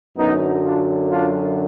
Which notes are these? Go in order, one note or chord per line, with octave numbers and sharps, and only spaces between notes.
F#2 D3 F#3 B3 D#4
D4 F4
D4 F4